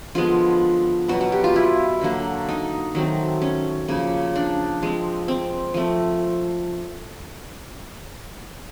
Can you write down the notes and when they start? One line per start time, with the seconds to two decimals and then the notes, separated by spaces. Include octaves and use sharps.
0.15 D3 F3 G#3 B3 F4
1.08 B2 F#3 B3 F#4
1.21 F#4
1.32 G4
1.44 F4
1.56 E4
2.01 D3 F#3 A#3
2.49 D#4
2.95 D#3 F#3 A3 C4
3.42 C#4
3.88 C#3 F3 A#3
4.36 D4
4.82 F3 G#3 C4
5.28 C4
5.74 F3 A3 C4